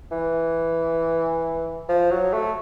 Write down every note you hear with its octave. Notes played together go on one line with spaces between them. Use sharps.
E3
F3
F#3
A3